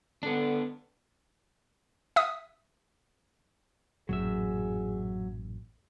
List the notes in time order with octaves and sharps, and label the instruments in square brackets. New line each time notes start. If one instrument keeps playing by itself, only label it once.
[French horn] D3 [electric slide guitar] B3 D4
[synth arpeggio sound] E5 D#6
[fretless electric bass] A1 F#2 A#2 [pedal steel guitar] F#3 E5 [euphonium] G#4